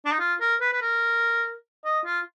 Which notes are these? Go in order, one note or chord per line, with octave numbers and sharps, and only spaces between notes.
D4
D#4
F4
A#4
B4
B4
A#4
D#5
F4